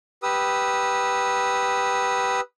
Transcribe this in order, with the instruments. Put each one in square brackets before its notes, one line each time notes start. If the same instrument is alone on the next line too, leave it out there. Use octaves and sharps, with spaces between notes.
[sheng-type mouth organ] G4 B4 D#6 E6